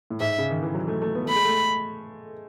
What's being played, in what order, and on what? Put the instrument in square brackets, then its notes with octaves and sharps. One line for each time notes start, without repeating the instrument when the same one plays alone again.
[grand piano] A2
[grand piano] G#2 [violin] E5
[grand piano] C#3
D#3
E3
F#3
A3
A3
B3
[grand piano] A3 [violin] B5
[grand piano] G#3
A3